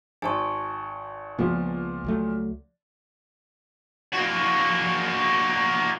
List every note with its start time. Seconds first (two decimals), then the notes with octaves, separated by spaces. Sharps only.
0.22 G#1 C5 G#5 A5 C#6
1.39 C#2 A#2 F3 G#3 B3
2.05 C#2 F#3 A3
4.13 A#3 F#4